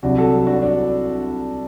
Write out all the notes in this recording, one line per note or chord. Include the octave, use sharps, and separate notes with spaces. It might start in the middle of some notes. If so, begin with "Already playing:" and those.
C2 C3 F#3 D4 F#4
F#4 A4
D4 F#4
D4